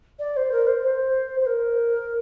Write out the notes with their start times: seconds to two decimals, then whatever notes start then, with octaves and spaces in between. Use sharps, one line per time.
0.19 D5
0.36 C5
0.51 A#4
0.66 C5
0.82 C5
1.40 C5
1.46 A#4